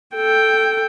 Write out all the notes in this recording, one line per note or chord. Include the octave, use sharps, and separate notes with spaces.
A4 G5